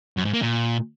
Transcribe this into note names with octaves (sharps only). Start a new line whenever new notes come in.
F#2
G#2
A#3
A#2